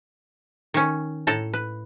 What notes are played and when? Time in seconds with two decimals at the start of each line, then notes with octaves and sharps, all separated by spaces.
0.74 D#3 C#4
1.27 A2 A4 A#5
1.54 B4